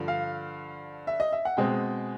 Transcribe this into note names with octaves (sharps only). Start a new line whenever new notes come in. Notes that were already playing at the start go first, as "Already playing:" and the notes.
Already playing: G2 D3 F3
F5
E5
D#5
E5
F#5
B2 G#3 C4 G5